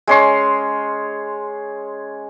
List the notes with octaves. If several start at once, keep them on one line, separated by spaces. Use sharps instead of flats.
G#3 C#4 C6